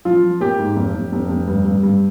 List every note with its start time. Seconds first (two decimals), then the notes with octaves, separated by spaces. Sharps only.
0.05 F3 F4
0.23 F3
0.40 A#3 G4
0.59 G#2
0.76 F1
0.94 F1
1.12 F1
1.29 F1
1.48 G2
1.65 G2
1.83 G2